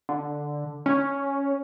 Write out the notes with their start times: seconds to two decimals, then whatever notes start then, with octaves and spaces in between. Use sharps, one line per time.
0.09 D3
0.86 C#4